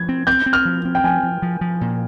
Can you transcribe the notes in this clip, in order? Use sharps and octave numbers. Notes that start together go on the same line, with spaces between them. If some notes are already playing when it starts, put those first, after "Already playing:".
Already playing: F3 G#6
C4
C4 G6
C4
F6
F3
C4
G5
F3 G#5
F3
F3
F3
A#2